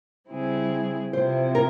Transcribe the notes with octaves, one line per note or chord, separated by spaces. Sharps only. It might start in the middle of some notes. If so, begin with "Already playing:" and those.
C#3 G3 C4 E4 G#4
C3 F3 C4 E4 C5
A#4